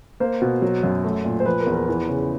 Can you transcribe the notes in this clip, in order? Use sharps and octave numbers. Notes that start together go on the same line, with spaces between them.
A#3 C5
B2
F#3
F#2
A3
A#2
C5
F3 B4
A#4
E2
A#4
E3 B4
C#3